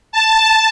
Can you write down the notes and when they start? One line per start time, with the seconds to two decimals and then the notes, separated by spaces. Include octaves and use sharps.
0.12 A5